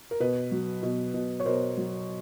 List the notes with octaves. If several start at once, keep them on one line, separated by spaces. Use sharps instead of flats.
A#4
B2 B4
F#3
B2
B2
C#5
B2 A#4 C5
F#3